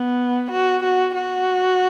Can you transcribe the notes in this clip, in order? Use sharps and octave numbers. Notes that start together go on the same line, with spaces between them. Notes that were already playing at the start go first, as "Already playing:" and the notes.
Already playing: B3
F#4
F#4
F#4